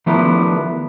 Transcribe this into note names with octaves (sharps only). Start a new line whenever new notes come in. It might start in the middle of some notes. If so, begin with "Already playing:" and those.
D#3 F3 G3 A3 B3 E4